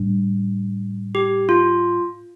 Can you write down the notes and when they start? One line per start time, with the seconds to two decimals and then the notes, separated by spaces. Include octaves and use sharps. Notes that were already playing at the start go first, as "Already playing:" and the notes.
Already playing: A2 G3 D4
1.15 G4
1.49 F4